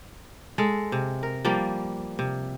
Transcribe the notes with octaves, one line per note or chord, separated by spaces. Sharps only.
G#3 A4
C3
A#4
F3 G3 A#3
C3